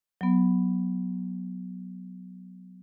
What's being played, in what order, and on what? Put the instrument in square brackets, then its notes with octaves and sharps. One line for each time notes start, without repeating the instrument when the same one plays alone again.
[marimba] F#3 B3